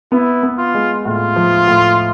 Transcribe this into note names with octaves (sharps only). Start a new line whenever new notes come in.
B3 E4
B3
F4
G#3
A2 F4
F3
A2